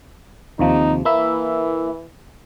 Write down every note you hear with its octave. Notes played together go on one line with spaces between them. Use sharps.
D#2 C3 F3 D#4
E3 A#3 E4 E5